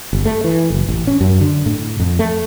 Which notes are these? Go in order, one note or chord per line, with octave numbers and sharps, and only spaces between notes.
G1
A3
E3
F#1
A1
C#4
F#2
D3
A2
F2
A3